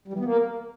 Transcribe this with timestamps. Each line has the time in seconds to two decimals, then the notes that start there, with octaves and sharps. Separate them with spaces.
0.08 G3
0.14 E3
0.19 B3
0.25 A#3